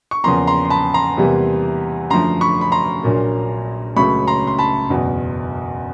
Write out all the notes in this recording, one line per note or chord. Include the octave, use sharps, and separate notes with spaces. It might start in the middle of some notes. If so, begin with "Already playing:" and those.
C#6
E2 C#3 F3 A#3 A#5 C6
A#5 C6
C6
A5 B5
A#5 C6
E2 C3 E3 G3 A#3
F#2 D3 F3 A3 A#5 C6
B5 C#6
B5
A#5 C6
A#1 A#2 F#3 A#3
C#2 C#3 F#3 A3 B5 C#6
A#5 C6
C6
A5 B5
F#1 E2 B2